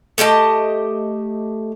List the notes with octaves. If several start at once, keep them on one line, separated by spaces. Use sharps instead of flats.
A3 G4 D#5 A5